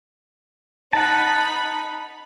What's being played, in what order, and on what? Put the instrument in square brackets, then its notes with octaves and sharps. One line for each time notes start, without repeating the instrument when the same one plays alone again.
[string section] D#4 B5 [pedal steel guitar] F#5 A5